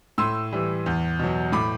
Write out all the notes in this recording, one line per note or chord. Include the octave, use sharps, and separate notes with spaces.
A2 C6 E6
E3 G3
E2
B2 F#3
A2 B5 D6